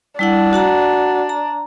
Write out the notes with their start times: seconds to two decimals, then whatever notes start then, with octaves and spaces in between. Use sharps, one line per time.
0.19 G3 D4 E4 F#5
0.53 F#4 F#5 A#5
1.29 A#5